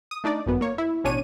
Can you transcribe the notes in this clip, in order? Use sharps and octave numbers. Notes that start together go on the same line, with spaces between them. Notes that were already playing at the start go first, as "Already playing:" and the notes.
D#6
A3 D4 D#4 D5
G#1 F#2 B3
A#3 C#5
E4
A1 B2 C#4 D4 C#5 D#7